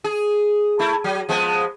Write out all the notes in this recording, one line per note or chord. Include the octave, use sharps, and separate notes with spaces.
G#4
A3 E4
F#3
F3 G#3 B3